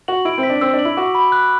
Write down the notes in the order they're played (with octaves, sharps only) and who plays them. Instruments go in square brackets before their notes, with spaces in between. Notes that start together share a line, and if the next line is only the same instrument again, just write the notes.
[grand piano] F#4 [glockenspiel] F#7
[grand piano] E4 [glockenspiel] D7
[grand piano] C4
[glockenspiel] B6
[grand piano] D4
[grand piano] C4 [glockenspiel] E6
[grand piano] D4
[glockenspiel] F#7
[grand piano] E4
[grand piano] F#4 [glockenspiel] D6
[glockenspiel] B5
F#6